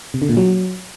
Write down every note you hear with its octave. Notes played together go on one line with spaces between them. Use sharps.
C3
D3
A#2
F#3